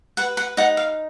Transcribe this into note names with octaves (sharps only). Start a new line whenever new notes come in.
B4 F#5
F#5
D#4 F#5
F5